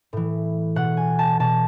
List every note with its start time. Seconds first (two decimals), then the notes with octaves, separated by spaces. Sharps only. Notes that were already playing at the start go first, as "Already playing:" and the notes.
0.13 A2 E3
0.76 B2 F#5
0.97 G#5
1.19 A5
1.40 B2 A5